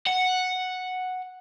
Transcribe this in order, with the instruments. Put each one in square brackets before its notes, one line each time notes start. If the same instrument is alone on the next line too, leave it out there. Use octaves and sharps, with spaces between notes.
[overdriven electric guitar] F#5